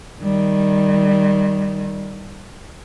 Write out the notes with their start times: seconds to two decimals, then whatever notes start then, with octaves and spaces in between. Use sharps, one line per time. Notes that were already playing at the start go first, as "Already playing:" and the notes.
0.22 D#3 G3